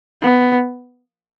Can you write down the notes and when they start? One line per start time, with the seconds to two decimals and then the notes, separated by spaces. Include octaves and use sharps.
0.21 B3